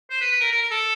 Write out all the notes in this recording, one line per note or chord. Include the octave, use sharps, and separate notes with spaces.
C5
B4
B4
A#4
A#4
A#4
A4